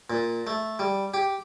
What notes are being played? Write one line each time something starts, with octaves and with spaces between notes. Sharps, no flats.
A#2
A3
G3
G4